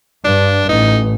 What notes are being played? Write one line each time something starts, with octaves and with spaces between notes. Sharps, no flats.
G2 D4
A1 D#4